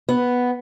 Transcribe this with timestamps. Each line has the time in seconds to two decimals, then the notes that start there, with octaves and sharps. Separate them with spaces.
0.09 B3